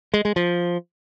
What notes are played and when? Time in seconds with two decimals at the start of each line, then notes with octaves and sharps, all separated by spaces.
0.14 G#3
0.25 G#3
0.36 F3